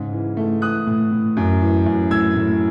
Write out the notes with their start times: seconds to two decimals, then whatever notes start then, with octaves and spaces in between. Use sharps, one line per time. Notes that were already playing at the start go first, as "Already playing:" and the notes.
Already playing: G#2 C#3
0.13 E3
0.37 A3
0.62 E3 D#6 F#6
0.87 A2
1.11 A2
1.37 F#2
1.62 E3
1.86 F#2
2.10 A2 E6 G#6
2.35 A2